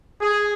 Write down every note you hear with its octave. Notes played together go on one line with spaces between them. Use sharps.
G#4